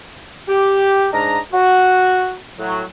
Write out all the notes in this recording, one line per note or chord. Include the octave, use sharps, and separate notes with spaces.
G4
G#2 D4 D#5 A#5
F#4
A2 F#3